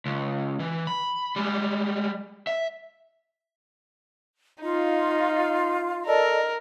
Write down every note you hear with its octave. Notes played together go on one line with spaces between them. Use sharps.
C#2
E3
B5
G3 G#3
E5
D#4 F4
A4 A#4 D5 D#5